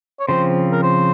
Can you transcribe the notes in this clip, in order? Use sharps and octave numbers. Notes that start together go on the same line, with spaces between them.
C#5
C#3 F3 C4 C5
A#4
C5